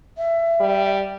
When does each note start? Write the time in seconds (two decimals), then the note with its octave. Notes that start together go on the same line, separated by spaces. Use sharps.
0.18 E5
0.60 G3